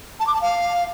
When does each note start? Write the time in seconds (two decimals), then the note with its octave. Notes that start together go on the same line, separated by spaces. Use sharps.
0.19 A5
0.27 D6
0.34 A5
0.41 F5